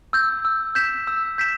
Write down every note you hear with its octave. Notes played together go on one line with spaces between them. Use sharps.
E6 G6
E6
G6 B6 E7
E6
G6 B6 E7